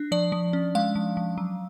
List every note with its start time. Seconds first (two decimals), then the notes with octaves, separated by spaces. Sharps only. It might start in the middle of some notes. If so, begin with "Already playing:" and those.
Already playing: D4
0.12 F3 D5
0.32 F3
0.53 C#4
0.75 G#3 F5
0.96 F3
1.17 F3
1.38 F#3